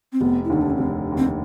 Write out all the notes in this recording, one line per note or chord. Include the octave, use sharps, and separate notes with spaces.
C4
F1 B3
E4
D#2 D3 D#4
D4
C#4
F1 C4
D#2 D3
C4